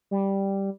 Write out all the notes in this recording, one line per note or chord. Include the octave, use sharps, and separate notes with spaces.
G3